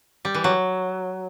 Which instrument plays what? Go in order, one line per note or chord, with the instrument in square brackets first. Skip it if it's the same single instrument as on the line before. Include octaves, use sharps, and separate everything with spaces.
[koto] G3
E3
F#3